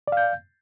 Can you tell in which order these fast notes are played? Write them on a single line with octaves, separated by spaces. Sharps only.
D5 F5 G6